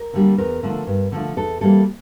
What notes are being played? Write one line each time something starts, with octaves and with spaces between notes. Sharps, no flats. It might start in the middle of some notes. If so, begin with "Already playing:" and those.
Already playing: A#4
D3 G3 A#3
E2 A#4
D3 F3 A3
G2
D3 F3 A3
E2 A4
E3 G3 A#3 A4